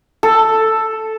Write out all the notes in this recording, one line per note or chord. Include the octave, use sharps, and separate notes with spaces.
A4